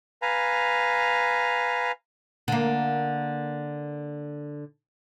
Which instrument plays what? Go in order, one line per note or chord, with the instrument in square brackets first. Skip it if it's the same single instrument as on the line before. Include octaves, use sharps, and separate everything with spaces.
[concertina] B4 F5 G#5 A#5
[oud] D3 A#3